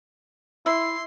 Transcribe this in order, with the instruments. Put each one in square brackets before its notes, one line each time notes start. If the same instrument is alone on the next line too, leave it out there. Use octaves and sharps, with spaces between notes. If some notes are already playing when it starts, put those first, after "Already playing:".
[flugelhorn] E4 [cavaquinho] E5 [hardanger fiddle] C6